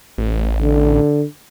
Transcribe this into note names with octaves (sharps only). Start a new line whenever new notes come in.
A1
D3